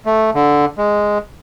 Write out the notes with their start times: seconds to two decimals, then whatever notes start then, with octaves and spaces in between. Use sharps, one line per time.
0.06 A3
0.34 D3
0.78 G#3